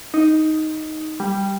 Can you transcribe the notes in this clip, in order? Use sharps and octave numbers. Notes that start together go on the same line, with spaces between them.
D#4
G3